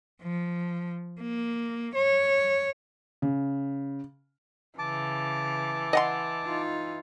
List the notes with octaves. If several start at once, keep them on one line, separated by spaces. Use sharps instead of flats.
F3
A#3
C#5
C#3
C#3 E3 A5 D6
D#5 F#5 C6
D#4 F4